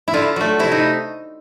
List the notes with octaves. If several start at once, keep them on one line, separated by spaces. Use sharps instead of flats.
E4
D3 F4
F#3 A3
C3 E4
D#4